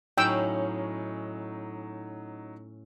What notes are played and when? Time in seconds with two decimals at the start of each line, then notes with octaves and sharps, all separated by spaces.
0.18 A2 F#3 C#4 D#4 G5 C#6 E6